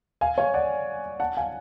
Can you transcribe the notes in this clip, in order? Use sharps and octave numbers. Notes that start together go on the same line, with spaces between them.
F5 G#5
C#5 F5
D5 F#5
F#5 A5
F5 G#5